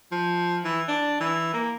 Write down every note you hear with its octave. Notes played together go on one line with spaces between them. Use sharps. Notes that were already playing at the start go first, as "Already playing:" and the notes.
F3
E3
D4
E3
A#3